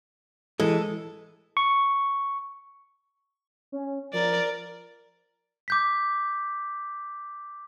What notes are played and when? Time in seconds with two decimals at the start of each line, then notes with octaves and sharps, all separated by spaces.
0.60 E3 G#3 A4
1.57 C#6
3.72 C#4
4.13 F3 A#4 D5
5.68 D6 G6 B6